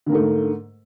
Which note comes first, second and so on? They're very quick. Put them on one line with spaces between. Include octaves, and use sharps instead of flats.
D3 A#3 G#2 A3